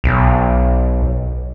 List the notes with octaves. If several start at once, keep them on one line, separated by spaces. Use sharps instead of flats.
B1